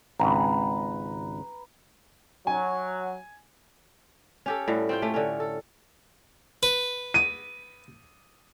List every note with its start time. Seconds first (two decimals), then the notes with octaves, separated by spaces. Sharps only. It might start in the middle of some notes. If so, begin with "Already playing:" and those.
0.19 G#1 C#2 B4 A#5
2.47 F#3 G#5
4.46 C#4 G4 A4
4.68 A2 G3 F#4
4.89 C4 F4 G5
5.02 A3 C#4 G4
5.14 D3 C#4
5.40 A4
6.63 B4
7.14 D#7